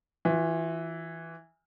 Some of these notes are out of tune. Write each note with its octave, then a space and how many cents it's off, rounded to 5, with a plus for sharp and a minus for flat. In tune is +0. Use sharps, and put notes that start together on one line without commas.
E3 -5 F4 +35